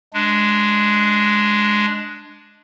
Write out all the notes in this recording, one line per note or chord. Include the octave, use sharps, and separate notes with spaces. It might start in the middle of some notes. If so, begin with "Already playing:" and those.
G#3 D4